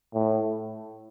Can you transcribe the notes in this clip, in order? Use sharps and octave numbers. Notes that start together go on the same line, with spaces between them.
A2